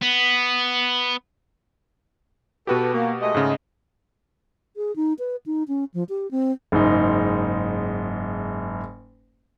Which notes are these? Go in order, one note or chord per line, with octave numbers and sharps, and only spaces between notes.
B3
B2 F#4 G4 A4 B4
A#3
G#3 A3 D#5
G#2 C#3
G#4
D#4
B4
D#4
C#4
F3
G4
C4
F#1 G#2 D#4